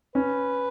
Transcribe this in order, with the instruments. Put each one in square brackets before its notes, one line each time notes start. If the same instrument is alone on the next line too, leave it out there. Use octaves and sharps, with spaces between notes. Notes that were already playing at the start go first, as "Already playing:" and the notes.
[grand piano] C#4 [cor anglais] B4